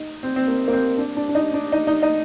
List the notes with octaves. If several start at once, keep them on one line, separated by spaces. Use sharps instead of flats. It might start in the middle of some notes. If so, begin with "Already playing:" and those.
Already playing: D#4
C4
C4
A#3
A#3
C4
D4
D4
D4
D#4
D4
D#4
D#4
D#4